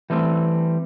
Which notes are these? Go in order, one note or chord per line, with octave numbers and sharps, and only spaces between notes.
E3 G3 A3 C4